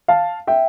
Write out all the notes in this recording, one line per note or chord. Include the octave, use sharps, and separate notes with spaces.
F5 A5
E5 G5